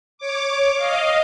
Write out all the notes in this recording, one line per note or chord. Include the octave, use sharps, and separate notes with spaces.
C#5 D6
D#5 F5